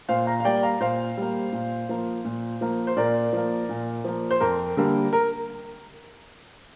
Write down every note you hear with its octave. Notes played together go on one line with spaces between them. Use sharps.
A#2 C5 F5
F5 A#5
F5
G3 A#3 D5 G5
F5 A#5
A#2 C5 F5
G3 A#3
A#2
F3 A#3
A#2
F3 A#3
C5
A#2 A#4 D5
F3 A#3
A#2
F3 A#3
C5
F2 A#4
D3 G3 A#3
A#4